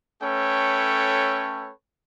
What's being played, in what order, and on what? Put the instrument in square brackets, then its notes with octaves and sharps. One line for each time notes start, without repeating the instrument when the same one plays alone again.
[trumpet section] A3 C#4 A4 B4 C#5 G5